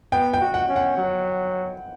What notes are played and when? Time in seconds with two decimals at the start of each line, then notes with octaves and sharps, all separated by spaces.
0.12 B3 G5
0.33 G5
0.41 F#4
0.54 F#5
0.68 C#4
0.76 F#5
0.97 F#3